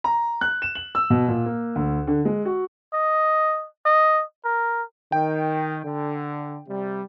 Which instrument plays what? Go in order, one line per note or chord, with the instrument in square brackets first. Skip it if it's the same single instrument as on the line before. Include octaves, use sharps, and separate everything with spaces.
[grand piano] A#5
F#6
E7
F#7
E6
B2
A#2
A#3
D2
D3
G#3
F#4
[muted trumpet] D#5
D#5
A#4
[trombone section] D#3 [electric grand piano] G5
[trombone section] D3
C3 G3